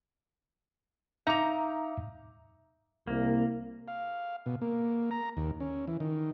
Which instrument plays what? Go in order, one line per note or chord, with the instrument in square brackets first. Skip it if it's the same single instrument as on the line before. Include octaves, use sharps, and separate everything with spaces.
[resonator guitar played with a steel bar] D#4 A#5 [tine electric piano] E5 F5 D6
[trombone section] C2 [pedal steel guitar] A#3
[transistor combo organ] F5
B2
A#3
A#5
D#2
C#4
E3
D#3